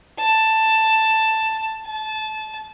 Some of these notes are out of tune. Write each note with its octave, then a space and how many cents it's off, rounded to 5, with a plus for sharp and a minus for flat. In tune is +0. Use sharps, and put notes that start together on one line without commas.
A5 +5
A5 -20